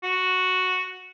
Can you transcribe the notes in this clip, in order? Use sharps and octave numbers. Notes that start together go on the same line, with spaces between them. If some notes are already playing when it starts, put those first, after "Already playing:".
F#4